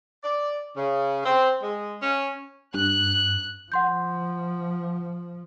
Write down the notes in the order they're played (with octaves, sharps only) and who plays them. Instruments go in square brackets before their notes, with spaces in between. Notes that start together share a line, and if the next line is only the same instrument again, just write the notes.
[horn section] D5
C#3
C4
G#3
C#4
[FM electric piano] G2 [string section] F#6
[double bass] F3 [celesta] F#5 C6 G6